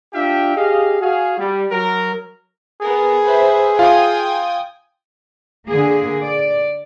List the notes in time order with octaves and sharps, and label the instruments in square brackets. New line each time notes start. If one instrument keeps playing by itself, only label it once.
[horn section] D4 F4 G4 E5 F5 G5
G4 G#4 D#5 F5
F#4 G#4 F5
G3
F#3 A#4
[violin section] B3 A#4 [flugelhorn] G#4
[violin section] B4 C5 E5
[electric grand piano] F4 F5 [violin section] G5 G#5 D#6
[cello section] D3 A#3 G#4
D5